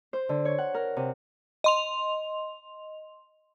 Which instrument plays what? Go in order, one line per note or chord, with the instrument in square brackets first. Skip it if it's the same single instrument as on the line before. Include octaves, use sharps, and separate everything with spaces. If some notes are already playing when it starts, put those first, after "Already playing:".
[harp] C5
D3
C#5
F#5
A#4
C3
[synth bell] D#5 C6 F7